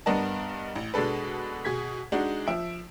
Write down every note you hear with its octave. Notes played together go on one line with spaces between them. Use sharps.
G2 B3 D4 A#4 D#5 A5
A1
B2 G#3 D4 A4 B4
B2 G#4 G#6 B6
G#3 D4 D#4 F#4
F3 E5 D7